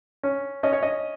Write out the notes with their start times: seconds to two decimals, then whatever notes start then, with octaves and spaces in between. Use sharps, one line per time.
0.23 C#4
0.63 C#4 D#5
0.73 C#5
0.83 D#5